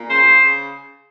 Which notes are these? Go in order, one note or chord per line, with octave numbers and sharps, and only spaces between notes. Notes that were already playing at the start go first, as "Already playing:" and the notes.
Already playing: A#2
C#3 C5
C#3
C#3